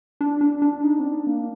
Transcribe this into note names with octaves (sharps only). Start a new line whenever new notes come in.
D4
D4
D4
D#4
C4
D4
A#3